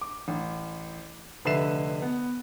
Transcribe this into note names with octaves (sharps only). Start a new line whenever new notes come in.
D6
A1
F1 D3 B4 E5 C7 E7
B3